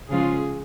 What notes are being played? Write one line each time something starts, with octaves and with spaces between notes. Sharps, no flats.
C#3 F3 G#3 C#4 F4 G#4